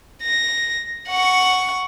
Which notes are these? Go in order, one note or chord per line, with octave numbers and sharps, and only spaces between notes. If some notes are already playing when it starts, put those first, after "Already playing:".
A#6
F#5 C#6